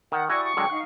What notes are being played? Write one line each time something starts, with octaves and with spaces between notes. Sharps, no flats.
D#3 F#5
E4 F#4 G4 D5 G#5 C#6 D#6
C#6
D3 F#3 G#3 A4 F#5 G5
D#4 F5 F#5